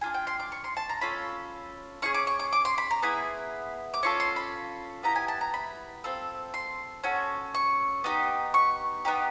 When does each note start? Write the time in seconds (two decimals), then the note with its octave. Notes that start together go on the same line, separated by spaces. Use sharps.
0.01 D4 F4 G#4 G#5
0.14 G5
0.27 C6
0.40 D6
0.52 C#6
0.64 C6
0.77 A5
0.89 A#5
1.01 C#4 F4 A4 B5
2.02 C#4 F4 G#4 C#6
2.14 D6
2.27 C#6
2.39 D6
2.53 D6
2.65 C6
2.78 B5
2.90 A#5
3.02 B3 E4 G#4 B5
3.94 D6
4.03 C#4 F4 A4 C#6
4.20 C6
4.36 B5
5.03 B3 E4 G4 A#5
5.15 G#5
5.28 A5
5.41 A#5
5.54 B5
6.04 C4 F4 A4
6.54 C6
7.04 C#4 F#4 A4
7.54 C#6
8.04 B3 D#4 G4
8.54 C#6
9.05 B3 D#4 G4